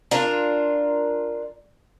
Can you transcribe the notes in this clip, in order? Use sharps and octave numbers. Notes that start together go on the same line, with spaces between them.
D4 F4 A#4